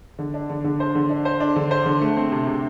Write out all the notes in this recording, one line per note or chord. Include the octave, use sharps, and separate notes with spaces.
D3
D4
D3
D3
C5
D3
D4
C5
D4
D3
C5
D3
A3
C4
C3
C3